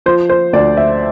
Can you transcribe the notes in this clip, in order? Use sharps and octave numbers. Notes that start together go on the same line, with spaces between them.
F3 C5
C5
D2 D5
E5